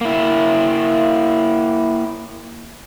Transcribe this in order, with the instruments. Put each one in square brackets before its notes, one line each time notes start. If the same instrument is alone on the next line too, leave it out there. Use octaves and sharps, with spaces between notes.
[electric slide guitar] A#3 E4